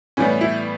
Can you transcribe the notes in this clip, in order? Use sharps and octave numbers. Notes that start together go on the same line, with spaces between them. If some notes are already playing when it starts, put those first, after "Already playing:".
A2 E3 G3 B3 C#4
E4